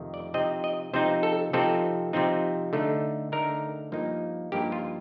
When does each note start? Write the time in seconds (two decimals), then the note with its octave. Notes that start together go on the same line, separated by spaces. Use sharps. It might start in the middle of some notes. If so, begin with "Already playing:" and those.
Already playing: F2 C3 D#3 A3
0.14 D5
0.34 C3 F3 C4 D#4 D#5
0.64 D#5
0.93 C3 F3 C4 D#4 C5
1.23 A4
1.53 C3 F3 C4 D#4 A4
2.13 C3 F3 C4 D#4
2.73 D3 A3 D#4
3.32 D3 A3 D#4 A#4
3.92 G2 F3 A#3 D#4
4.52 G2 F3 A#3 D#4 G4
4.72 F4